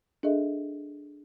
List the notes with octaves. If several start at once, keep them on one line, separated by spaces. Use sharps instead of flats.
D4 G#4 A4 D#5 E5